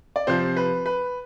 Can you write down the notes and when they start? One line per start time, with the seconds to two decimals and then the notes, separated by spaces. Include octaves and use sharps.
0.16 D5
0.27 C3 F3 C4 C5
0.57 B4
0.86 B4